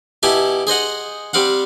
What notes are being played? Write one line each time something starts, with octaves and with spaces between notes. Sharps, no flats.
B2 E4 G4 G#5 A5
G#4 C5 D#5 F#5
G3 C4 F5 F#5